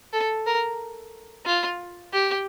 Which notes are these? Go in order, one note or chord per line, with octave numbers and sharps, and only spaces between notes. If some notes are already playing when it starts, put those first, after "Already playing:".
A4
A#4
F4
G4